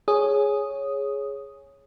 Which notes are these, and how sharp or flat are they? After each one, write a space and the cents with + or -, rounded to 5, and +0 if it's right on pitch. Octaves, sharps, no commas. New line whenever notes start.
G#4 +0 C#5 +0 D#6 +0